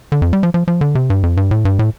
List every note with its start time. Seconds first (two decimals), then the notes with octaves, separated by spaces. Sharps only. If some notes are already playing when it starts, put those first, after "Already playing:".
0.12 D3
0.22 F2
0.33 G3
0.43 F3
0.54 F3
0.68 F3
0.81 D3
0.95 C3
1.10 G2
1.23 F2
1.37 G2
1.51 A2
1.65 G2
1.79 A2